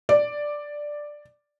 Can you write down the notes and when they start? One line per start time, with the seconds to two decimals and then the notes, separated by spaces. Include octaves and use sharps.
0.09 D5